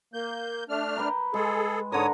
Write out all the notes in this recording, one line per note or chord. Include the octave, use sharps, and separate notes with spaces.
A#3 G6
A3 D4 F6
B4 G5 A#5
G#3 G#4 A4
G#2 D3 A#4 C#5 D#6